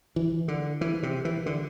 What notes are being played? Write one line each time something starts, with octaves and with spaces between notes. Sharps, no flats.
E3
D3
E3
C3
E3
D3